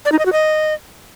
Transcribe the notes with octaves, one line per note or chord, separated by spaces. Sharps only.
D5
D#4
D#5
F#4
D#5